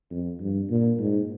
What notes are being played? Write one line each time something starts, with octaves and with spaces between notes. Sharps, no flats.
F2
G2
A#2
G#2